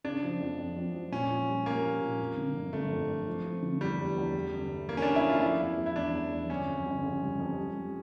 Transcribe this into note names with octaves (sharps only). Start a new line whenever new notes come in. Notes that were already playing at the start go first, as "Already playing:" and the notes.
C#3 D4
F3
F2
F2
F2
F3
A#2 C#4
F4
G3
G3 A#3
F4
A#2
F2
D3
G1
G1 A3
F2
F2
F3
F3
D3
E2 G3
E2
E2
A3
G1
A3
E3 A#3
C#4
E3 D4
E4
A3 F4
F3 E4
E2
E2
E4
E2 D4
E2
E2
G1 C#4
F2
G1
C#3
G3
F2
G3
G3